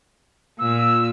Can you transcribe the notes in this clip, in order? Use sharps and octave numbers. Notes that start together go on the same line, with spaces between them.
A#2 E6